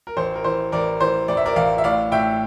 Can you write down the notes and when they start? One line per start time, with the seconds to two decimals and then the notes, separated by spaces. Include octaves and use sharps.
0.07 A#4
0.17 A1 C5
0.35 A#4
0.44 E3 C5
0.72 A1 A#4 D5
1.00 E3 C5
1.28 A1 D5
1.37 E5
1.46 A#4 D5
1.56 A1 D5 F5
1.78 E5
1.84 A2 D5 F5
2.12 A2 E5 G5